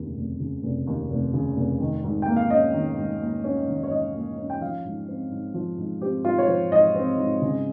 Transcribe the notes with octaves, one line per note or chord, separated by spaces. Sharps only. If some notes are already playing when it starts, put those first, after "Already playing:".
Already playing: F1 D#2 C#3
F1
C#3
F1
D#2
F1
C#3
F1
D#3
G#2
G5
A#3
F5
C#4 D#5
D#3
G#2
A#3
C#4
D#3
C#5
G#2 D#5
A#3
C#4
G5
F3 F5
G#2
C4
G#2
F3
G#2
C4 G4
G#2 F4
C#5
F3 C5
G#2 D#5
C4
G#2
C#3